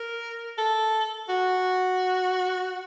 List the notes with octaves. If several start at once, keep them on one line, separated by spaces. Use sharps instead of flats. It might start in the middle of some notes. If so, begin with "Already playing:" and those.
Already playing: A#4
A4
F#4